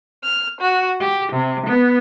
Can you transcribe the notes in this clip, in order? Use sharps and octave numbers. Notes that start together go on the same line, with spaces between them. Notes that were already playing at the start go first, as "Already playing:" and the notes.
F6
F#4
G4
C3
B3